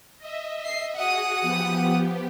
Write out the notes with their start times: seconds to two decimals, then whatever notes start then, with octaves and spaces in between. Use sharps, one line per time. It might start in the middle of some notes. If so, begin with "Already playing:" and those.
0.19 D#5 E5
0.65 C7
0.96 F#4 G#4 F#5 D#6
1.41 F3 B3 G4